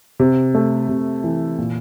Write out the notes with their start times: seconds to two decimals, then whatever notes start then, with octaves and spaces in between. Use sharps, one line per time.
0.20 C3
0.55 A3
0.89 C3
1.24 E3
1.58 A#2